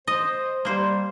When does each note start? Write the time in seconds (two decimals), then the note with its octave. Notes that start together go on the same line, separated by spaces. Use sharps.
0.07 C5 D#5
0.65 G3 A#3 C5